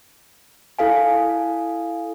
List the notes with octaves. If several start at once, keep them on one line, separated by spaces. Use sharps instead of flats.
E4 A4 F5 G#5